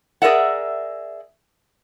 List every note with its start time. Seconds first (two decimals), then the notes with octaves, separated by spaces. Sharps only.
0.22 G#4 A#4 D5 E5 F#5